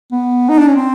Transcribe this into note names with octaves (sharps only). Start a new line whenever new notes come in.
B3
D#4
D4
C#4
C4